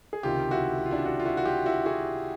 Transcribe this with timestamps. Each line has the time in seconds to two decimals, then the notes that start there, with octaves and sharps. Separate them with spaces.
0.13 G#4
0.23 C#2 C3 D#3 F4 G4
0.51 E4 F#4
0.78 E4
0.85 F4
0.91 D4 E4
1.05 E4 F#4
1.20 F4
1.26 E4 F#4
1.37 F#4
1.45 F4 G4
1.66 E4 F#4
1.86 F#4 G#4